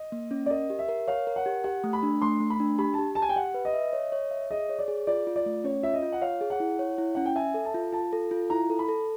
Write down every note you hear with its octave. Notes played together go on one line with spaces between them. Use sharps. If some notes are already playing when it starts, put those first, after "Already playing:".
Already playing: D#5
A#3
C#4
D5
A#4 D#5
G4
E5
A#4
C#5 F5
A#4
F#5
G4
G4 F#5
A3
B5
D4
A3 C6
A3
B5
D4
G4 B5
G4 A5
G4 A5
G#5
G5
G4 F#5
B4
D#5
E5
C#5
C#5
E5
G#4 D#5
C#5
D5
G#4
F4 D5
F4
D5
A3
C#4 C#5
F4 E5
D#5
F4
F#5
C#5 F5
G#4
F#5
E4
C#5
E4
C#4 F#5
G5
E5 G#5
A4
A5
F4
F4 A5
A4
F4
E4 A#5
A4
B5
A4